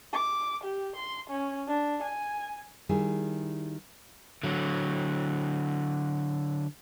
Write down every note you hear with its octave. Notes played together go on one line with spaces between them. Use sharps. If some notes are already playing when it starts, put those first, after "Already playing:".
D6
G4
C6
C#4
D4
G#5
D#3 G3 E4 G#4
D3 F#3